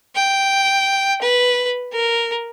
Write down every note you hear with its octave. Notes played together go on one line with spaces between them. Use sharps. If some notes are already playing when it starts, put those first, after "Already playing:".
G5
B4
A#4